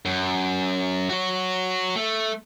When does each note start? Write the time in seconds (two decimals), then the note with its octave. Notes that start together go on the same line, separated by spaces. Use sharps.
0.06 F#2
1.10 F#4 C#5
1.96 A3